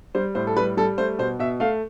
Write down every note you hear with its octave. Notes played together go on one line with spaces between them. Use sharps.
G3 C5
A2 C5
A4
G3 B4
G3 A4
A3 C5
B2 C5
B2 E5
A3 F5